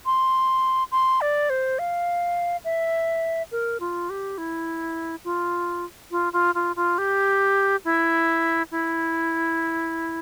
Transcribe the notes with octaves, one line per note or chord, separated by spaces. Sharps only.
C6
C6
D5
C5
F5
E5
A#4
F4
G4
E4
F4
F4
F4
F4
F4
G4
E4
E4